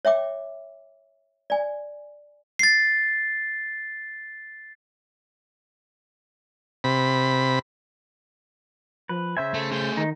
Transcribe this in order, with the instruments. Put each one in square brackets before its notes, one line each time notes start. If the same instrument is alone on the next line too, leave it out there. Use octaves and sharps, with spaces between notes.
[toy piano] C#5 E5 G5 D6
D5 G#5
[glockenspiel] A6 C7
[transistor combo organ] C3 B5
[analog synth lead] F3 [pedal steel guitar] B4
[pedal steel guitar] C#3 C5 G#5 [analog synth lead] E5
[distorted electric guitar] A3
[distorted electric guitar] A3 G#4 [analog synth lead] G6
[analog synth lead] D#3 [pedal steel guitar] D#4